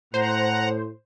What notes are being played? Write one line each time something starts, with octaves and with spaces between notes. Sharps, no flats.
A2 C5 F#5 A#5